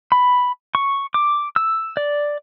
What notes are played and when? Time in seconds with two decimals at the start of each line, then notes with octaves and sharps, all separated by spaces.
0.12 B5
0.75 C#6
1.14 D6
1.56 E6
1.97 D5